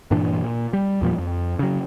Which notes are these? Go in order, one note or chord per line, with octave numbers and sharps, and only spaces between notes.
G2 A#2 E3 D4
A#2
G3
E2 A#2 F3 G3
F2
C#3 F#3